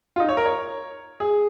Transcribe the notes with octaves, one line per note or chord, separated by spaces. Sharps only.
F4
D#4
C#5
A#4
C#5
G#4